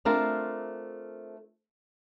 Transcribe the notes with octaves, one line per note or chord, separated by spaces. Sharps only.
A3 C4 D4 F4 A#4